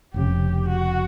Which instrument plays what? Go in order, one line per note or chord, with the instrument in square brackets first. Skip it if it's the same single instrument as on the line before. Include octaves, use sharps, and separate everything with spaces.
[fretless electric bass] F1 F2 C#3 [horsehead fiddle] G4
[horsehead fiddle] F#4